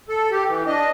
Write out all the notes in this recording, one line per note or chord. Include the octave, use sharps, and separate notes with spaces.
A4
G4
E3
D4 D#5